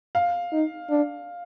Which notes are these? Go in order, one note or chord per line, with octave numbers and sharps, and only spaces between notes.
F5
D#4
D4